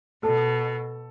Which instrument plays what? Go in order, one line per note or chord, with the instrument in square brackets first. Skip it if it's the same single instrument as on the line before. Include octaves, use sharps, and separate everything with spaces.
[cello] B2 [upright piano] A4